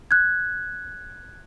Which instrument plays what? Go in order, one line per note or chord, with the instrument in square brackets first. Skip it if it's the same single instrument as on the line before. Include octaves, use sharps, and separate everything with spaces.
[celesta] F#6 G#6